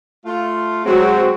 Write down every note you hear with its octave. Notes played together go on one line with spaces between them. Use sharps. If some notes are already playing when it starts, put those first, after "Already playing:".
A3 F4
F#3 G#3 C4 F#4 G#4